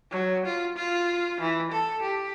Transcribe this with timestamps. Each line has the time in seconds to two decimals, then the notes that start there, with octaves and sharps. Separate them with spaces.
0.12 F#3
0.46 F4
0.77 F4
1.41 E3
1.72 A4
2.02 G4